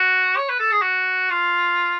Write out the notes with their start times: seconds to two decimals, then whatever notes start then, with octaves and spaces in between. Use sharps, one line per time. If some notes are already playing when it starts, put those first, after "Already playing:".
Already playing: F#4
0.37 C#5
0.49 B4
0.60 A4
0.72 G#4
0.82 F#4
1.31 F4